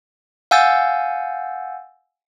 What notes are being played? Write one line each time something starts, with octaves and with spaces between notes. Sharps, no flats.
F5 F#5 G#5 E6 G6 A6